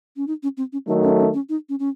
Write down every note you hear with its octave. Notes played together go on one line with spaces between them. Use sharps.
C#4
D#4
C#4
C4
C#4
D#3 F#3 A3 D#4
C#4
C#4
C#4
D#4
C#4
C#4